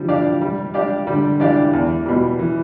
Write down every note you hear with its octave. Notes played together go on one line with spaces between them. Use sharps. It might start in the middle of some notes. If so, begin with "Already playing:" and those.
Already playing: D3 E3 F3 G3
D4 G4 D5 F5
G3
D4 G4 D5 F5
D3 G3
E3 D4 G4 D5 F5
E2
B2 G3
E3